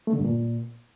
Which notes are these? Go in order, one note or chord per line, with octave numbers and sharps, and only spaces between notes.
A3
D3
G2
A#2